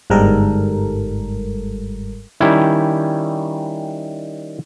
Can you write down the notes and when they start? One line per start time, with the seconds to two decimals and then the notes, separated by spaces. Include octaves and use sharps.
0.10 G1 G#2 G3 A4 A#4
2.40 D#3 G3 C#4 E4